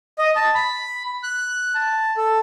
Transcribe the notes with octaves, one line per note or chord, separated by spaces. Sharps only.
D#5
A5
B5
F#6
A5
A4